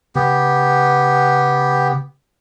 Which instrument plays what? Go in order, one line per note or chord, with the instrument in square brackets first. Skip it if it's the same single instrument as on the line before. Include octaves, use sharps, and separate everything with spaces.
[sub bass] C#3 [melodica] B3 G4